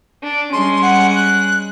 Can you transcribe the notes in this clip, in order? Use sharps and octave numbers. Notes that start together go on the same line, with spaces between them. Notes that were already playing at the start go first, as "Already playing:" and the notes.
D4
G3 G#3 C#4 C6
F#5
F#6